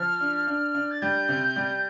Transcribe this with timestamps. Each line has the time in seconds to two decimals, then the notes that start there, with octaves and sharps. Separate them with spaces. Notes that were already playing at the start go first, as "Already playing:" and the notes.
Already playing: F3 F6
0.20 D4
0.47 D4
0.75 D4
0.91 A6
1.02 G3 G6
1.29 C3
1.56 G3